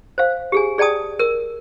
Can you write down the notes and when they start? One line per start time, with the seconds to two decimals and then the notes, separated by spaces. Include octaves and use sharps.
0.18 C5 F5
0.52 G4 G#4 G#5
0.78 G#4 D5 G5 A5 D#6
1.19 A#4 E6